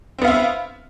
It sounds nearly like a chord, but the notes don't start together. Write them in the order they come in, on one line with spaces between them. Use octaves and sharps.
C4 B3 F5 E5